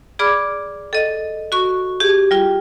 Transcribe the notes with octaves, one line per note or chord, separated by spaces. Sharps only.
G#4 D5 B5 D6 F6
A4 D#5
F#4 C#6
G4 G#4
G3 F4